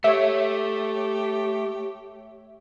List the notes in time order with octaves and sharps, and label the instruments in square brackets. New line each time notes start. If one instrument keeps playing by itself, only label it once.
[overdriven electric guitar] A3 [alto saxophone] G4 [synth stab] C#5 E5